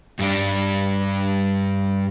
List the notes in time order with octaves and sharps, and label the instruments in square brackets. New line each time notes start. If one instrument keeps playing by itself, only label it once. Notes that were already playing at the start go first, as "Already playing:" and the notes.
[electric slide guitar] G2 G3 D4